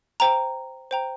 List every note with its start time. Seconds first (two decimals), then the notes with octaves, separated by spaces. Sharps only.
0.20 C5 G5 A#5
0.91 C5 G5 A#5